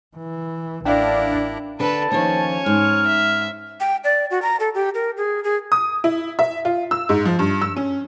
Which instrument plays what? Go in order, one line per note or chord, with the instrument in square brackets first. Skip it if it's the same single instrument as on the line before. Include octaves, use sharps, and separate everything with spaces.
[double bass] E3
[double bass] A1 [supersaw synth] D4 [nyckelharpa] E4 A#4 [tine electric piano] D5 F5 G5
[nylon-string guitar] D3 D4 [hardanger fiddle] A4 B4 [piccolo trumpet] A5
[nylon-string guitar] D#2 F3 [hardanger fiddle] C#4 C#5
[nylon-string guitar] G#2 [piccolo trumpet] F6
[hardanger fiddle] E5
[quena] G5
D5
F#4
A#5
A4
G4
A#4
G#4
G#4
[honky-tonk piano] D#6
E4
E5
F4
E6
G#2
F3
G2
E6
C#4